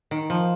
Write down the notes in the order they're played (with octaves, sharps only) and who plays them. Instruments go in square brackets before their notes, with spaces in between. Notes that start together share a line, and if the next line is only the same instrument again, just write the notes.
[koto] D#3
F3